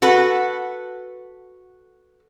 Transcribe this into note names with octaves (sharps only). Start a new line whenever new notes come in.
F#4 A4 B4